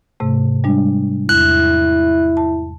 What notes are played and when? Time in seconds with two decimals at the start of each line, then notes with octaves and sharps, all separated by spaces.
0.20 G#2 C3 A3
0.64 G3 G#3 D4
1.29 E2 E4 F#6
2.37 A5